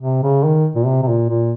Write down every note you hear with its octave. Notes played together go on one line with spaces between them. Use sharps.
C3
C#3
D#3
A#2
C3
C3
A#2
A#2